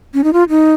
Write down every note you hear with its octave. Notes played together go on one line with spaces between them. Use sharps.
C#4
D#4
F4
D#4